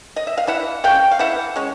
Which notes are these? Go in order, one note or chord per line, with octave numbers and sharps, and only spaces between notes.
D#5
E5
F5
E3 E5 F#5
G#3 C#4 F5 G5
F5
E3 E5 F#5
G#3 C#4